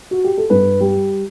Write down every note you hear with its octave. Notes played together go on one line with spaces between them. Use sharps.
F#4
G4
A4
G2 B4
G3